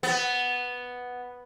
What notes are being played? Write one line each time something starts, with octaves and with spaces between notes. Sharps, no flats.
B3